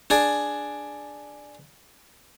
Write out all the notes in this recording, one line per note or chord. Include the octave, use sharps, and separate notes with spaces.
D4 G#4 D5